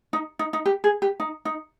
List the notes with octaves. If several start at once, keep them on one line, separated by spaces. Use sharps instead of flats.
D#4
D#4
D#4
G4
G#4
G4
D#4
D#4